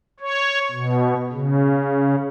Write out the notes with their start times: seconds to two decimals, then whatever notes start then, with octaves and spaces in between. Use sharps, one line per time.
0.20 C#5
0.71 B2
1.32 C#3